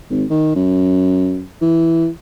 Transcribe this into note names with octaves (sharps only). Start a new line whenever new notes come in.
G#1
D#3
F#2
E3